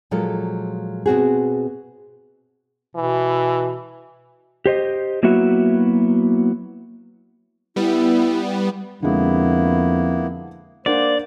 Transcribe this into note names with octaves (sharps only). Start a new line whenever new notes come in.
A#2 F3 F#3 G#3 F4 A4
B2 C4 F#4 G#4
B2 E3
G4 C5 D#5
F#3 A#3 B3 E4 F#4 E5
G3 B3 E4
F2 D3 G#3 A#3 B3 E4
A#3 D4 A#4 C5 D5 F#5